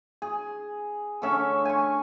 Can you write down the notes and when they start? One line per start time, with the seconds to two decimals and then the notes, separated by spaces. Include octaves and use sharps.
0.22 G#4
1.22 D3 A3 C#4 E5
1.65 G#5 C#6